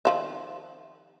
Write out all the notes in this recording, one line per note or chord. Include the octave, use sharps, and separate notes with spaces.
D#3 F3 E5